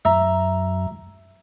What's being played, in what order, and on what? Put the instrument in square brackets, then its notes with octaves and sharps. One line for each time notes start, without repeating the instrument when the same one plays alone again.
[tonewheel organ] F#2 [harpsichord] E5 A#5